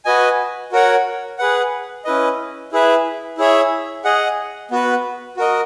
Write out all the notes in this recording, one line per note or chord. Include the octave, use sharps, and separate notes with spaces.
F#4 B4 D#5 G#5
F#4 A#4 C#5 F#5
G#4 B4 F#5
C#4 E4 B4 D#5
E4 G#4 B4 E5
E4 G#4 C#5 E5
G#4 D#5 F#5
B3 F#4 B4
F#4 A#4 D#5